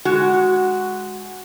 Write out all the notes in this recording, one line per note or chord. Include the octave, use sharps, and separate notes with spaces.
G#3 F#4